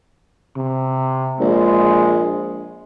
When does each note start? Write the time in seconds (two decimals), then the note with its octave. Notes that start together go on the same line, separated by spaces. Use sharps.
0.57 C3
1.40 A#1 G#3